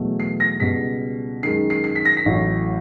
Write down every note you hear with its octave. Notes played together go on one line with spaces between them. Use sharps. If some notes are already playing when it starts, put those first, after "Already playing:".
Already playing: E2 B2 F#3 A3
C7
A#6
C#2 B2 G3 B6
F#2 D#3 G#3 C7
C7
C7
B6
A#6
B6
A1 A2 F#3